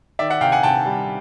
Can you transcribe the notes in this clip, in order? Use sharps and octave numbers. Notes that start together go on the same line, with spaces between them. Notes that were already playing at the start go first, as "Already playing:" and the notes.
D#3 D5 E5
E5 F#5
C3 F5 G5
F#5 G#5
C3 G5 A5
G3